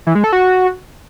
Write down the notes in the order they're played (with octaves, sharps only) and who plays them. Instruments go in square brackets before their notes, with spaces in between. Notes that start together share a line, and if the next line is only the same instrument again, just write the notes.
[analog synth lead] E3
G#3
A4
F#4